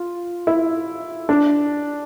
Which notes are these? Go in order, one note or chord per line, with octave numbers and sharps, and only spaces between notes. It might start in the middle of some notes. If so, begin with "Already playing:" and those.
Already playing: F4
E4
D4